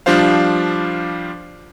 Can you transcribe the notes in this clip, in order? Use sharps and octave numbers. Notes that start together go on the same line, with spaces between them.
F3 G3 D4 F4 C5 F5